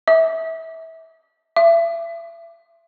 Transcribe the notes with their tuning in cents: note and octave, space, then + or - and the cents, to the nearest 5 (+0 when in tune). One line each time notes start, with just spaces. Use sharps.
E5 -25
E5 +30